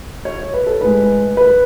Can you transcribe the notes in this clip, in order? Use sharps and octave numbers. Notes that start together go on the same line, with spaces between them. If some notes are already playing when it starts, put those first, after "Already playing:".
C#5
C#5
B4
A4
A2 G#3 B4
B4